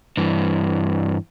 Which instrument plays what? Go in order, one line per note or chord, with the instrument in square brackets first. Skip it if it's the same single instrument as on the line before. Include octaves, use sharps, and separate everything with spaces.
[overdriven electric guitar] G2 E3